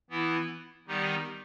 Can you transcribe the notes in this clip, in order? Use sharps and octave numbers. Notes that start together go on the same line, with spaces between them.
E3 B3 E4
D#3 G3 B3 D#4 G4